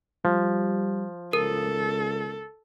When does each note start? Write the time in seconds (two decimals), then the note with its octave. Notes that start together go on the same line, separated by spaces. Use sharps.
0.25 F3 G3
1.33 C#2 A4 A#4